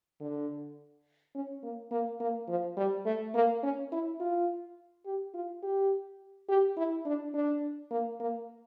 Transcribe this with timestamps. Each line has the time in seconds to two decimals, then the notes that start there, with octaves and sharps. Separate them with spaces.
0.21 D3
1.35 C#4
1.63 A#3
1.91 A#3
2.20 A#3
2.48 F3
2.77 G3
3.06 A3
3.35 A#3
3.63 C#4
3.92 E4
4.20 F4
5.06 G4
5.34 F4
5.63 G4
6.49 G4
6.77 E4
7.06 D4
7.34 D4
7.91 A#3
8.20 A#3